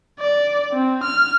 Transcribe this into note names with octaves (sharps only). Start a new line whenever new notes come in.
D5
C4
F6